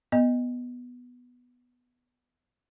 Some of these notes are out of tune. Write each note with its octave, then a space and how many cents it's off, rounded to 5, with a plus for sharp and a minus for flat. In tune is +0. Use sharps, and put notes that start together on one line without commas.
B3 +0 D#5 +0